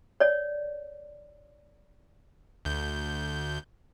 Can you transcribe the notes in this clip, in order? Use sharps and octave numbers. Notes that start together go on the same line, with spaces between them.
C#5 D5
D2 G6